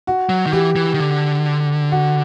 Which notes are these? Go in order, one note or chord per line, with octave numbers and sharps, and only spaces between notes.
F#4
F#3
D#3
E3 G4
E3
D#3
D3
F#4